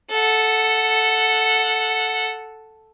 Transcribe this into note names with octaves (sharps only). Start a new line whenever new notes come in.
A4 F#5